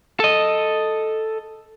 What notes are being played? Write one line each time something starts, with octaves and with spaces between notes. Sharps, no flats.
A4 D#5